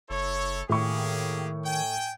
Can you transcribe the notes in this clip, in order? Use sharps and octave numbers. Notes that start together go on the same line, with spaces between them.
F#1 E4 A4 C#5
A2 D#3 A#3 G4 G#4 C#6
G5 G#5